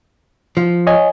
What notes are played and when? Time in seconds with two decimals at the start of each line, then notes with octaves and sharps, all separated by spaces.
0.57 F3
0.87 C#5 D#5 G#5